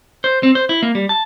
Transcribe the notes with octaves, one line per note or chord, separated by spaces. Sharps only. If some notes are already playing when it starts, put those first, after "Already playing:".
C5
C4
C5
E4
A#3
G3
A5